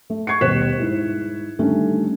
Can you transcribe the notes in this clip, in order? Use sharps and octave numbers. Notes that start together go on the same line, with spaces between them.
A3
C#6 G#6 C7 C#7
D#1 B2 C5 F#6 B6 E7
G#2 E4
D3 D#3 G3 A3 C#4